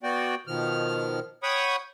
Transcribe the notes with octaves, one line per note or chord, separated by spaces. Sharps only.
B3 F#4 D5 G5
B2 D#3 F3 F6
C#5 F#5 G5 B5 C#6 D#6